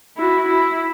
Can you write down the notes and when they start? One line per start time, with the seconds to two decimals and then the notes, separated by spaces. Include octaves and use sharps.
0.17 E4 F#4
0.48 E4